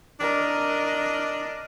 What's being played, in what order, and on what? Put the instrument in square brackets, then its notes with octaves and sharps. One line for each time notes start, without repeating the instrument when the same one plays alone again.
[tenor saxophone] D4 [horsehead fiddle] A#4 D#5